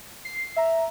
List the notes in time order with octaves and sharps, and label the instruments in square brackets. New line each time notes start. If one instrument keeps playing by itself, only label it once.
[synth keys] C7
E5 A#5